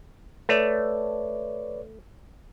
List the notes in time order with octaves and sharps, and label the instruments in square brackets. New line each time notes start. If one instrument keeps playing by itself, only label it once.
[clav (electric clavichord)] A3 [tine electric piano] B4 C#5 D5